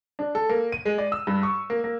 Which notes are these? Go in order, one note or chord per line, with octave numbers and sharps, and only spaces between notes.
D4
A4
A#3
D#7
G#3
D5
E6
G2
C#6
A#3
A#3